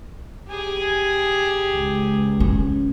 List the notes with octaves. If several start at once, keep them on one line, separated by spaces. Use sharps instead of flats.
G4 G#4
C#2
C#4